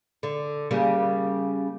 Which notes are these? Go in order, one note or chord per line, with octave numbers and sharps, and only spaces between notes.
D3
C#3 G3 A#3